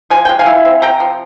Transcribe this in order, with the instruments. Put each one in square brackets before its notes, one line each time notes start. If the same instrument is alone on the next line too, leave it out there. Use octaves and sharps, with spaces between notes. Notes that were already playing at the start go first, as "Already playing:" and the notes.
[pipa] F3 G#5
G#3 G5
F5 G#5
E4
C4
C3 G5 A#5
F3